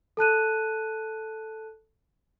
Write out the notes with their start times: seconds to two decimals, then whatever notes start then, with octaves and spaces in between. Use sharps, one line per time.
0.17 A4 A5 F#6 D#7